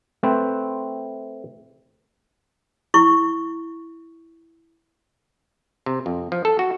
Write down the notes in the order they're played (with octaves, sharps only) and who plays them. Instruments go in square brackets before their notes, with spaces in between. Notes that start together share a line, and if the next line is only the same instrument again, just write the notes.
[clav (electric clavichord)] A3 C4 B4 C5
[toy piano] E4 C#6
[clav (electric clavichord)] C3
F2
F3
A4
F#4